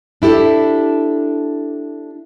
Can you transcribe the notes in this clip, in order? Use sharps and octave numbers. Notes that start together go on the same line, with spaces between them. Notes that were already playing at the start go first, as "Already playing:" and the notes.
D4 E4 G4 A4